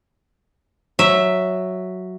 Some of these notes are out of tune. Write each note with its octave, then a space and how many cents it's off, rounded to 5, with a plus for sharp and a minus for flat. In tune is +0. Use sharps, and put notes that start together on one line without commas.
F#3 +0 E5 +0